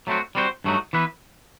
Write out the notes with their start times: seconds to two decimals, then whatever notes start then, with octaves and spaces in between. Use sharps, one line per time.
0.07 F#3 A3 C4 F#4
0.35 G3 C4 F#4 A4 C5
0.64 G2 F#3 A3 D#4 F#4
0.93 E3 B3 E4 B4